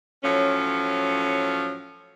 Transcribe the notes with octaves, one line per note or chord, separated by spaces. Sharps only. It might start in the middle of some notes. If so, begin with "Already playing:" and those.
A2 F3 F#3 C#4